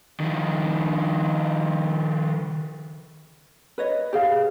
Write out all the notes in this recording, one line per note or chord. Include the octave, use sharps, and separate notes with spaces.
D#3 F3
B4 C#5 D#5
G4 G#4 F5